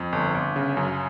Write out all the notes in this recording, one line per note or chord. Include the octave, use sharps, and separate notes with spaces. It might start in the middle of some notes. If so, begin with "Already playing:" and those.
Already playing: F2
G1
G1
C#3
F#2